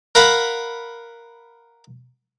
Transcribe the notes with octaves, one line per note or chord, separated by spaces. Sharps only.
A#4 F5 F#5 B5